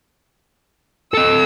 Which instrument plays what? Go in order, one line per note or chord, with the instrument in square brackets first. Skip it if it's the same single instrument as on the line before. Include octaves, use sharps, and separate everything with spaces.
[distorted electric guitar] A4 D#5 [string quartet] E6